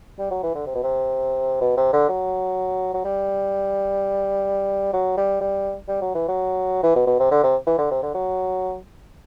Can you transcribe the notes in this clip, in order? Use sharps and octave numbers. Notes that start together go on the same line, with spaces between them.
G3
F#3
E3
D3
C3
B2
C3
B2
C3
D3
F#3
F#3
G3
F#3
G3
G3
G3
F#3
E3
F#3
E3
B2
B2
C3
D3
C3
E3
D3
C3
D3
F#3